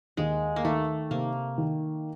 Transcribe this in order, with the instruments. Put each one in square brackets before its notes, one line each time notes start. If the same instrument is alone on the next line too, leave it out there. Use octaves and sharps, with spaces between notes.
[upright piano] D#2 [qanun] G#3
[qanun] A#3
[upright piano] D#3 [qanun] A3
[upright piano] C3 [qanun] A#3
[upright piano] D#3